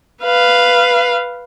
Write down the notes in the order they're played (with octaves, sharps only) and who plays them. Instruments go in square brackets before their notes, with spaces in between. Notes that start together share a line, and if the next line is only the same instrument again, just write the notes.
[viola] B4 F5